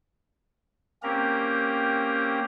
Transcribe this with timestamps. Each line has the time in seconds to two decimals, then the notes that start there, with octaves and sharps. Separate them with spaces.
1.03 A#3 C4 C#4 G4 A#4 A#5